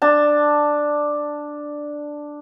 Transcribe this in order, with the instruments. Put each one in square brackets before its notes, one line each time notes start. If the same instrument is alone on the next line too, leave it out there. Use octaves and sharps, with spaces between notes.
[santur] D4 A5